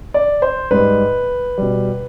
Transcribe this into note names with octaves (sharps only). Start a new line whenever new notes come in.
D5
C5
G#2 G3 B4
B2 G3